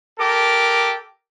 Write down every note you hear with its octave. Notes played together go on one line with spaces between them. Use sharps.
G4 A4 A#4 D6